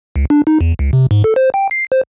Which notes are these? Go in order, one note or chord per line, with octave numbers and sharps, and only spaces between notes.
C#2
D4
D#4
E2
C#2
C3
G#2
A4
C5
G5
C7
C5